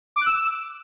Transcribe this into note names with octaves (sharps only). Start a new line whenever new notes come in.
D6
F#6
E6